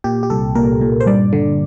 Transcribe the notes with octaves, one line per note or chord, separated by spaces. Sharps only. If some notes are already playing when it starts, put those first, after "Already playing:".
A#2 G4
G4
C2 A4
A#2 A#4
A#2
C5
G2 D5
D3